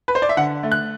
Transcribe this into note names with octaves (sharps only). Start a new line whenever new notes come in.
B4
C5
D5
E5
D3 F#5
A3
F#6